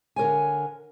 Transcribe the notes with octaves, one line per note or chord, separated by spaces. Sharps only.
D3 A#4 C#5 G#5